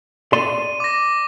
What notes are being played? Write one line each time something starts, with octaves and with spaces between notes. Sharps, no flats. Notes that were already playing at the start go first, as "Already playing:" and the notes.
D5 C6 D#7
D6 A#6